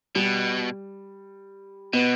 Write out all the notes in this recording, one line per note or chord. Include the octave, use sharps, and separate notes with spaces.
B2 G3
B2 B3